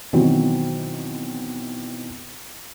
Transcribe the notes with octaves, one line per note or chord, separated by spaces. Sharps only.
B2 D#3 E3 F#3 C4